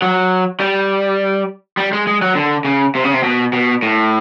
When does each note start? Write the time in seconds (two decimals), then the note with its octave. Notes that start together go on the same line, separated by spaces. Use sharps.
0.02 F#3
0.60 G3
1.77 G3
1.93 G#3
2.07 G#3
2.22 F#3
2.35 D3
2.65 C#3
2.95 C3
3.04 C#3
3.13 C3
3.23 B2
3.53 B2
3.83 A2